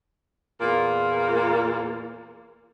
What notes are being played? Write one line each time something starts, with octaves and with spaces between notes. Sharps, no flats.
E2 A#2 A#3